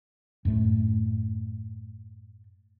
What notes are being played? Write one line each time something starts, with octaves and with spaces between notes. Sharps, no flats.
F#2 A2 A3